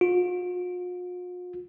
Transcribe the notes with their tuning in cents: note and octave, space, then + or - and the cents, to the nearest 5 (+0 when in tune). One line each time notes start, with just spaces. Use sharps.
F4 +45